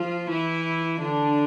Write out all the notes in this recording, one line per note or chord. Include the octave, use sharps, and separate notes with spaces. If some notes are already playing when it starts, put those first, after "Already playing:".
Already playing: F3 F4
E3 E4
D3 D4